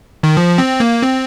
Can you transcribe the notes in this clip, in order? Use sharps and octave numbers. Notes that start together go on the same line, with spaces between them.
D#3
F3
C4
A#3
C4